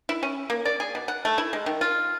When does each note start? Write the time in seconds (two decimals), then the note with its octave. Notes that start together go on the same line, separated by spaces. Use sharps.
0.09 E4
0.23 C#4
0.50 A#3
0.65 D5
0.80 G#4
0.95 B2
1.08 F#5
1.25 A3
1.38 E4
1.53 G#3
1.66 D#3
1.81 F4